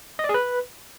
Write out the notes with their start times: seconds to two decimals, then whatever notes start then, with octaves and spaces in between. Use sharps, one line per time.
0.19 D#5
0.24 D5
0.29 G#4
0.34 B4